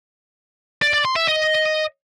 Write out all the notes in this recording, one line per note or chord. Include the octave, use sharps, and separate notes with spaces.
D5
D5
C6
E5
D#5